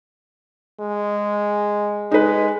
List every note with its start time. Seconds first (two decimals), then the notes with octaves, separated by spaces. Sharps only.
0.80 G#3
2.11 G#3 D#4 B4